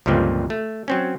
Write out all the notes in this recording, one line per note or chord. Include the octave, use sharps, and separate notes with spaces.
C#2 G2 A#2 D3 F3 C4
A3
F#3 C4 C#4